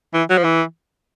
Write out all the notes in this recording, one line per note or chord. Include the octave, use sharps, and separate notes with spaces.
E3
F#3
F3
E3